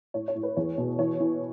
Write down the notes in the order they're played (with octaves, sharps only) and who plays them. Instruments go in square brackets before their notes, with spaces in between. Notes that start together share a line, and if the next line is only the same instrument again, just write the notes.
[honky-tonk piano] A2 C#5
C#5
A2
B4
E2 C#5
B2
E3 C#5
E3